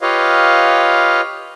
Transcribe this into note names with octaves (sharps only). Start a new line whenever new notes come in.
F4 G4 B4 C#5 D#5 F5